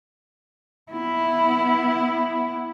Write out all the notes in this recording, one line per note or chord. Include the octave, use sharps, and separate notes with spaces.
B3 E4